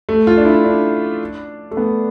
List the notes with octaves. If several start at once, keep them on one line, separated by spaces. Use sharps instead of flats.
A3
F4
D4
E4
D4
A3
B3